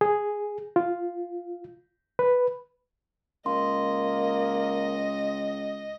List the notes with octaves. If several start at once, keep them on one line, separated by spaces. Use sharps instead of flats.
G#4
F4
B4
C#2 A#3 D#5 C6